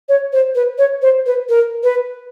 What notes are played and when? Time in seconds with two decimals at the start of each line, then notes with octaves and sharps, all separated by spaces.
0.09 C#5
0.33 C5
0.55 B4
0.78 C#5
1.02 C5
1.26 B4
1.49 A#4
1.83 B4